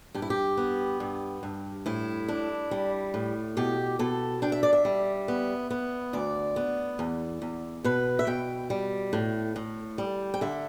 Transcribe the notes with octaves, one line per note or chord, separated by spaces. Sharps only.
G2 G4
E4
G4
B3
G2
G2
A2 E4
D4
G3
A2
B2 G4
B2 A4
D4 G5
E5
D5
E5
G3
B3
B3
D2 D5
B3
E2
E2
B2 B4
E5
B2 G5
G3
A2
A2
G3
G5
D3 E5